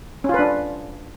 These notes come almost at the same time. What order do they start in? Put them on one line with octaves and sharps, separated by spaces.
C#4 F4 B4 D4